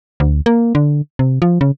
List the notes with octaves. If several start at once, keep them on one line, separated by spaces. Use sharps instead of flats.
D2
A#3
D3
C3
F3
C#3